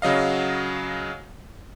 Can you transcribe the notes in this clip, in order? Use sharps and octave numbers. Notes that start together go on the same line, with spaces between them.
C#3 F#3 D#5 F5